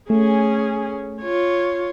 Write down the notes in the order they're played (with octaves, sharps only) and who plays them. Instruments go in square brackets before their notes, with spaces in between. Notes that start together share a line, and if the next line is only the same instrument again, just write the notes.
[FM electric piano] A3 [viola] C#4 G#4
[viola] F4 C#5